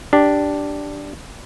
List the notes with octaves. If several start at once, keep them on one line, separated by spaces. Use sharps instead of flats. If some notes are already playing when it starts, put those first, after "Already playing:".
D4 G4